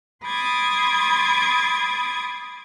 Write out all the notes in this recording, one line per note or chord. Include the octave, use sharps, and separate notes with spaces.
B5 C6 D6 D#6 G#6 A6